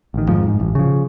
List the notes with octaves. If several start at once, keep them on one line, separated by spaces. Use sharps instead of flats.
A1 D#3
F2 G#2 F3
G#2
A1
C#3 F3